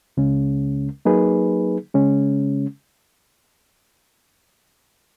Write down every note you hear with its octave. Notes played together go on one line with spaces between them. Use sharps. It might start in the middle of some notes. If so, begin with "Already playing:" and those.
C#2 C#3 G#3 C#4
F#3 A#3 D#4 G#4 B4
C#3 G#3 C#4